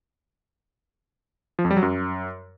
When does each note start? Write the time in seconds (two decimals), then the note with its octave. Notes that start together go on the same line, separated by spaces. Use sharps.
1.59 F3
1.65 F2
1.71 G3
1.77 F#3
1.83 F#2